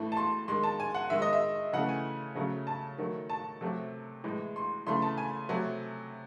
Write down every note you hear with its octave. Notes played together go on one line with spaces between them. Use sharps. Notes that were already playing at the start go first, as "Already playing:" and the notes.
Already playing: A2 E3 A3
A5
C6
D#3 G#3 C6
A5
G#5
F#5
D#3 G#3 E5
D#5
E5
C#3 E3 A3 F#5
G#5
C#3 F#3 A3
A5
D#3 F#3 A3
A5
C3 F#3 A3
A2 E3 G#3
C6
C#3 E3 A3 C6
A5
G#5
C3 F#3 A3